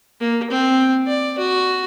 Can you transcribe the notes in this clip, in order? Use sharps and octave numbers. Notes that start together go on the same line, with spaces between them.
A#3
C4
D5
F#4